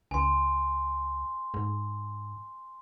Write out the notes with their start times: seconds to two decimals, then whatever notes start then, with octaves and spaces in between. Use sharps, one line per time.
0.11 C#2 G#5 C6
1.54 G#2